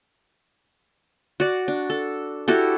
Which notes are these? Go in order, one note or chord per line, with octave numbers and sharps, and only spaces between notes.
F#4 D5
D4
A4
E4 F#4 G4 A4